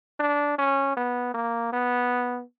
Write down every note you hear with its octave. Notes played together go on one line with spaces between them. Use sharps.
D4
C#4
B3
A#3
B3